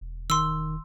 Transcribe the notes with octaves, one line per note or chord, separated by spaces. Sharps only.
E1
D#3 C6 E6